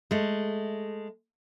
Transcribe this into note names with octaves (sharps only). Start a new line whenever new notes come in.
G#3 A3